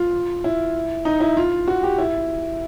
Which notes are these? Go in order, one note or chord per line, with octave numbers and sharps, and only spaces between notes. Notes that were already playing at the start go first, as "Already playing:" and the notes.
Already playing: F4
E4
D#4
E4
F4
F#4
G4
E4